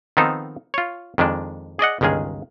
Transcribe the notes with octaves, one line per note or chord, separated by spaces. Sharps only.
D#3 F3 B3 C4 D#4 A4
F4 C#5
F2 D#3 G#3 D4
G#4 D5 D#5 F#5
G1 C#2 D#3 G#3 G#4 F5